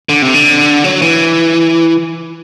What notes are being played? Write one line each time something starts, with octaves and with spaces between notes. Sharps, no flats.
D3
C3
D3
F#3
E3